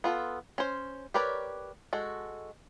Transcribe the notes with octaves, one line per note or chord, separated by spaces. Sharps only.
B3 F4 A4
C#4 C5
G4 A#4 B4 C#5 D5
G#3 F#4 A4